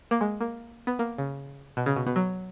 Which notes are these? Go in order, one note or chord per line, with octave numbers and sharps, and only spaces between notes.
A#3
G#3
A#3
B3
A#3
C#3
B2
C#3
B2
B2
F#3